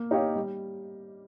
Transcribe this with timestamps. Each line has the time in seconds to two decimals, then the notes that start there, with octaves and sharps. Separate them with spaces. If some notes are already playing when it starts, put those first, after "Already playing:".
Already playing: A#3
0.11 D#4 G4 C#5 F5
0.35 G3